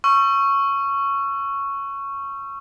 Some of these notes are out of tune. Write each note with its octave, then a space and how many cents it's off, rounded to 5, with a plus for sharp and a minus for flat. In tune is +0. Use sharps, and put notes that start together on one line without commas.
C#6 +0 E6 +40